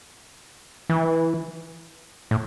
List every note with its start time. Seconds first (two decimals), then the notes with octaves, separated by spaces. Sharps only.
0.90 E3
2.31 A2